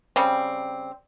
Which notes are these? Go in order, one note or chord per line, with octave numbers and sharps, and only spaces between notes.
C#3 G3 C4